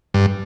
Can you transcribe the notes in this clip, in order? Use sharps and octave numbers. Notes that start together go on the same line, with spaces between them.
G2